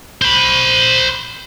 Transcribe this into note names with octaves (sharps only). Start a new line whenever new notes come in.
C5 B5